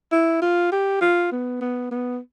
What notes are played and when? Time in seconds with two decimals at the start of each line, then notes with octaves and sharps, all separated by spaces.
0.12 E4
0.42 F4
0.72 G4
1.02 F4
1.32 B3
1.61 B3
1.91 B3